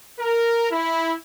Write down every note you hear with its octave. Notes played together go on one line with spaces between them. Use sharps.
A#4
E4